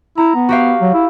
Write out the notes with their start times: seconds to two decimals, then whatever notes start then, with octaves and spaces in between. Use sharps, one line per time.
0.18 E4 A#5
0.35 B3
0.49 F#4 G4 F5
0.81 F#3
0.94 E4